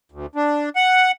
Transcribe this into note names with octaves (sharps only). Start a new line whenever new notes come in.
D2
D4
F#5